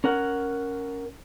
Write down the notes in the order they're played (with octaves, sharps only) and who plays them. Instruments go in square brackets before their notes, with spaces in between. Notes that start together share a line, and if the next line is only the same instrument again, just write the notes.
[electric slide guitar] C#4 A#4 F#5